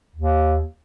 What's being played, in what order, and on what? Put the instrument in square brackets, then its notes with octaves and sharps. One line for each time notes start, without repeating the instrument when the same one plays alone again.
[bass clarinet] D#2